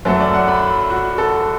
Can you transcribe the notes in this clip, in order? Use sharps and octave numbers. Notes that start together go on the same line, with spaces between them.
F#2 F#3 A3 A4
D5
F#5
B5
F#4
A4